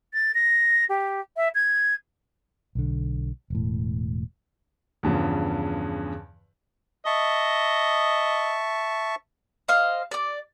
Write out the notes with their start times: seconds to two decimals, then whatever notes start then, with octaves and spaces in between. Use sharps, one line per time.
0.13 A6
0.34 A#6
0.89 G4
1.37 E5
1.55 G#6
2.75 B1 D3
3.50 E1 A2
5.03 E2 G2 C#3 F3
7.06 D#5 E5 A5 C#6
9.68 C5 D#5 F5
10.11 D5 D6